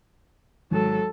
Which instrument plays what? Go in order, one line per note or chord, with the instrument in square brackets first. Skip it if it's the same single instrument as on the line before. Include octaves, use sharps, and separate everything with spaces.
[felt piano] G#1 [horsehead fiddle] F#3 A4